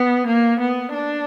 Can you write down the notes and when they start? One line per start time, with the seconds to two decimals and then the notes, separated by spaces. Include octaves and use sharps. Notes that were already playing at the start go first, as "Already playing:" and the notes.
Already playing: B3
0.27 A#3
0.60 B3
0.94 D4